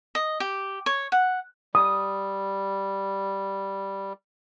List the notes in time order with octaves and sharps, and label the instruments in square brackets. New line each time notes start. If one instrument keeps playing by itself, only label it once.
[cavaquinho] D#5
G4
C#5
F#5
[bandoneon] G3 [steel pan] D#6